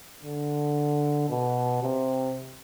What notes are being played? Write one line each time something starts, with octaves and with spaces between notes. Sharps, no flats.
D3
B2
C3